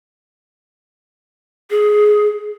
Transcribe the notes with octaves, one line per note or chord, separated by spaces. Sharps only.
G#4